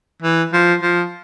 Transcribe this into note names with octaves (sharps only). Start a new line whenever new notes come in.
E3
F3
F3